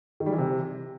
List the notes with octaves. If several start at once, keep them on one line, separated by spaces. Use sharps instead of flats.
D#3
G3
E3
C3